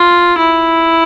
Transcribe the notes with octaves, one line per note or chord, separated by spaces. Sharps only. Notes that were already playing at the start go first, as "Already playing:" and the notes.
Already playing: F4
E4